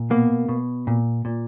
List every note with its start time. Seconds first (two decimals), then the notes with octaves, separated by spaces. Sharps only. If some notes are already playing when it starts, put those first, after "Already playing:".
Already playing: A#2
0.10 B2 A#3
0.49 B2
0.87 A#2
1.25 A#2